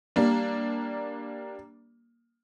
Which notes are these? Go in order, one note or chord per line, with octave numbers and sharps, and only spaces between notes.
G3 A#3 D4